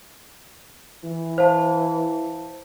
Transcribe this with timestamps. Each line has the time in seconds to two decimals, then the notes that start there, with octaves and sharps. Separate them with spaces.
1.05 E3
1.38 C5 F5 A5